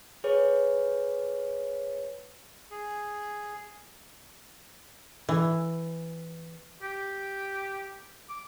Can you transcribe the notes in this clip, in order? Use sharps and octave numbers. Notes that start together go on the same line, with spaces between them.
G#4 B4 C#5
G#4
E3
G4
D6